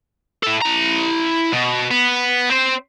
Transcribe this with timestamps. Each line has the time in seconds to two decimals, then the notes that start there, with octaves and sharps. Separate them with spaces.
0.43 E4 A4
0.62 E4 A#5
1.53 B2
1.91 B3
2.50 C4 C5